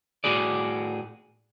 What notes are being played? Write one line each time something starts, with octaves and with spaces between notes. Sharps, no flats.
A2 F#4 G#4 D5